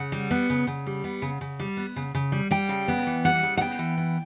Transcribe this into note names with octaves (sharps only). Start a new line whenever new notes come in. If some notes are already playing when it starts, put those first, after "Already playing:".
Already playing: C#3 F#5
G3
B3
C#3
C#3
G3
B3
C#3
C#3
G3
B3
C#3
C#3
G3
G3 G5
C#3
B3
E3
G3 F#5
C#3
F#5
B3 G5
E3
B3